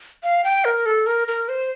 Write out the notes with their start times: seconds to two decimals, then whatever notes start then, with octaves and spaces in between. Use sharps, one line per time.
0.23 F5
0.44 G5
0.65 A#4
0.86 A4
1.06 A#4
1.28 A#4
1.49 C5